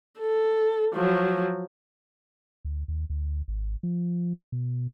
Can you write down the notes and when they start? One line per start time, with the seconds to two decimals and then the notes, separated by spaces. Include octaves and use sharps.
0.19 A4
0.95 F3 F#3
2.65 D2
2.88 D#2
3.10 D2
3.48 G#1
3.83 F3
4.52 B2